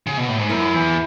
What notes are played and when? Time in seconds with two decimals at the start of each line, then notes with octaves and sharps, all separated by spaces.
0.07 C#3
0.18 B2
0.28 A2
0.39 G#2
0.49 F#2 E4
0.74 E2